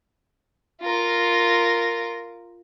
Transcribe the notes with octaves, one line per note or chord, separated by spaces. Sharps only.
F4 A#4